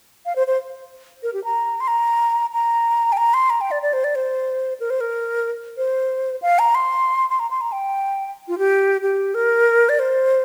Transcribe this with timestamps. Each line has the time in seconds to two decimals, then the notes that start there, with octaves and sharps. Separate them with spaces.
0.25 F5
0.36 C5
0.47 C5
1.23 A#4
1.33 G4
1.44 A#5
1.80 C6
1.87 A#5
2.53 A#5
3.12 G5
3.17 A#5
3.34 C6
3.50 A#5
3.61 G5
3.71 D5
3.82 D5
3.93 C5
4.04 D5
4.15 C5
4.80 A#4
4.90 C5
5.00 A#4
5.77 C5
6.42 F5
6.59 A#5
6.75 C6
7.30 C6
7.39 A#5
7.51 C6
7.61 A#5
7.72 G5
8.48 F4
8.58 G4
9.02 G4
9.34 A#4
9.89 D5
9.99 C5